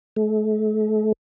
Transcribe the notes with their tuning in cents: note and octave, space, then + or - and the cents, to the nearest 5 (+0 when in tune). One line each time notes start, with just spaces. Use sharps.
A3 -40